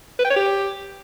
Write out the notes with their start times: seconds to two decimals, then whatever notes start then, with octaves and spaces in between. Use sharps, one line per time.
0.19 B4
0.25 G5
0.30 C#5
0.36 G4